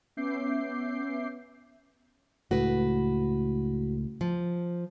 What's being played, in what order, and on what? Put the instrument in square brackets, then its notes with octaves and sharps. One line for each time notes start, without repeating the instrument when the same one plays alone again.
[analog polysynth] B3 C#4 E5 D6 G6 C7
[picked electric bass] C#2 A2 [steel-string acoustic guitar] F#4 B4
[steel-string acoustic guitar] F3